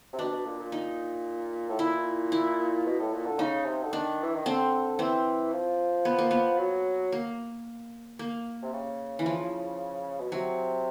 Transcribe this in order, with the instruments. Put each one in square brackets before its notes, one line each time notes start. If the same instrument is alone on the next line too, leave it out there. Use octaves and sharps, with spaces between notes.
[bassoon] C3
[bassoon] B2 [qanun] D4
[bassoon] B2
A#2
A#2
[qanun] D#4
[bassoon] A2
[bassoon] A#2 [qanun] E4
[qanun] E4
[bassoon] B2
A2
A#2
D3
[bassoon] C#3 [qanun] D#4
[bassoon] C3
D3
[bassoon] D#3 [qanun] D4
[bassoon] E3
D#3
[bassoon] D3 [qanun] C4
[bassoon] E3 [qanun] C4
[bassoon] F3
[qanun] B3
A#3
B3
[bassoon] F#3
[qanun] A#3
A#3
[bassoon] C3
C#3
[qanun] E3
F3
[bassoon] B2
[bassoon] C3 [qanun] F#3